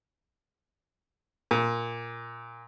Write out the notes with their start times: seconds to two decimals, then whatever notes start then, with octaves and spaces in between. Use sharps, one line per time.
1.51 A#2